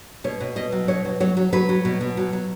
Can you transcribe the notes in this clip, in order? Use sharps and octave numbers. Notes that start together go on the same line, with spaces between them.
B2 C#5
B2
B2 D#5
F#3
B2 C#5
F#3
F#3 C#5
F#3
F#3 B4
F#3
B2
B2
F#3
F#3